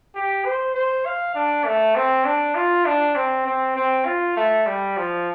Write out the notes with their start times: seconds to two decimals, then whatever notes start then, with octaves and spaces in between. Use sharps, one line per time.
0.15 G4
0.45 C5
0.75 C5
1.06 F5
1.35 D4
1.65 A3
1.96 C4
2.25 D4
2.55 F4
2.86 D4
3.16 C4
3.46 C4
3.76 C4
4.06 F4
4.37 A3
4.66 G3
4.97 F3